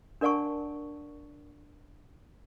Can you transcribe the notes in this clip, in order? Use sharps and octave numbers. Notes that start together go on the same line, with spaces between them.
D4 A#4 D5 F#5 A5 C#6